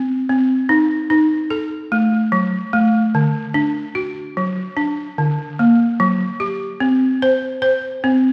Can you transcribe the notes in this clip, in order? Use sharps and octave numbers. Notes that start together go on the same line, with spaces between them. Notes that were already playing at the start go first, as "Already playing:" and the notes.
Already playing: C4
C4
D#4
D#4
A4
A3
F#3
A3
D3
D4
F#4
F#3
D4
D3
A#3
F#3
G4
C4
C5
C5
C4